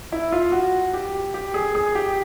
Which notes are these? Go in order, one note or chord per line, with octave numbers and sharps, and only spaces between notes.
E4
F4
F#4
G4
G4
G#4
G#4
G4